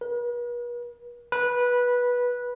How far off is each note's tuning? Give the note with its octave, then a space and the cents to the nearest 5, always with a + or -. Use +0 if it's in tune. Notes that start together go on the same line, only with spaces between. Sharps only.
B4 -45
B4 -15